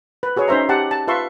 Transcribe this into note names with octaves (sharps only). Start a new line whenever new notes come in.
B4
F#4 G#4 B4 C#5
C#4 D#4 C5 E5 A#5
G4 F#5 A5
A5
F4 B4 E5 A5 C6 C#6